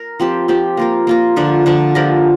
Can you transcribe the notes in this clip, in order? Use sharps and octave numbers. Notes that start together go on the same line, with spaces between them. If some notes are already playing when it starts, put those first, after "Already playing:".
Already playing: A#4
F3 C4 G4
F3 C4 G4
A#3 F4 A#4
A#3 F4 A#4
D3 F3 D4
D3 F3 D4
F3 D4 G4 A#4